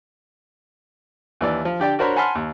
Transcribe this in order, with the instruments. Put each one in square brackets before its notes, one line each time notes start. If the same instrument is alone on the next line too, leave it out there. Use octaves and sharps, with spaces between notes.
[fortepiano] D#2 E3 D5
F3
D3 G4 D5 G5
D4 F#4 A#4 C5 C#5 B5
F#5 G#5 A5 B5 C6 F6
D#2